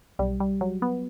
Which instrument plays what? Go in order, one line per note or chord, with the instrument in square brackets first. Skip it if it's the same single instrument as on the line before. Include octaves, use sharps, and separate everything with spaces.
[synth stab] B1 G3
G3
F#3
B3